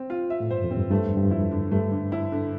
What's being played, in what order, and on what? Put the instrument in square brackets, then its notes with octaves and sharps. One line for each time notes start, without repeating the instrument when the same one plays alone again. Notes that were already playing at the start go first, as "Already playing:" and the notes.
Already playing: [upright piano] C4
F4
E5
[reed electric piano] A2
[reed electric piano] G2 [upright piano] C5
[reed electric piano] F2
[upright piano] C4
[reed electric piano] G2
[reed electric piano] G2 [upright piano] A3
[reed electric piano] F2
[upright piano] D3
[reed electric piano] G2
[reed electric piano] F2 [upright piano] E4
[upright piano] D3
[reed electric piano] G2 [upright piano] A3
[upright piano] D3
E4
D3